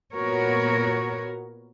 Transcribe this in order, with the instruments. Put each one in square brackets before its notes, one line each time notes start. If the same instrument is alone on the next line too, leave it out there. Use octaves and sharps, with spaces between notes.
[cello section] A#2 B3 F#4 A#4 C#5